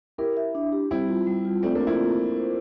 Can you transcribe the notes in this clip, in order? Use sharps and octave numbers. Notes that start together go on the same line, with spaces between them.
E4 G4 A#4
E5
D4
G4
G3 C4 E4
F4
G3
F4
A3 C4 D5
A#3 D4
F4
C4 E4
A#3
F4
C5